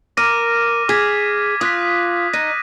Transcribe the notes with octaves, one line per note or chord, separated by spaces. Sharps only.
A#4 D6 F6 A#6 D#7
G#4 D6 G#6 B6
F4 D#6 F#6 B6
D#4 F#6 A#6 D#7